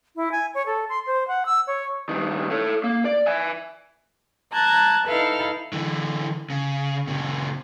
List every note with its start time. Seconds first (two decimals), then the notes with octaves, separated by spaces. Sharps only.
0.16 E4
0.32 G#5
0.54 C#5
0.66 A4
0.89 C6
1.07 C5
1.28 F#5
1.46 E6
1.67 C#5
2.09 G2 D#3
2.51 A4 C#5
2.84 A#3
3.05 D5
3.27 E5 G#5
4.52 A5 A#5 F#6 G#6
5.06 D#4 E4 A4 B4 F5
5.73 D3 E3
6.50 C#3
7.07 A#2 C#3